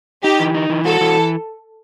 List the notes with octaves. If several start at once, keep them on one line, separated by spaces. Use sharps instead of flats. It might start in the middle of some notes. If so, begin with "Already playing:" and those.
D#4 G4
E3
D#4
E3
F#4 A4
E3